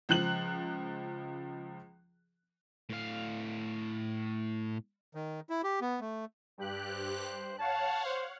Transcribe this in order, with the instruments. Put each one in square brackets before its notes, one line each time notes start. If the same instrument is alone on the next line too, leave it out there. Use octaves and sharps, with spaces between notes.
[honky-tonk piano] C#2 F3 F#6 F#7
[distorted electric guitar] A2 F5
[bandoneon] D#3
E4
G4
B3
A3
[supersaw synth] G2 G4 F#6
[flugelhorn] C5
[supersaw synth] C#5 F5 F#5 [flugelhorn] A5
[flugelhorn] C5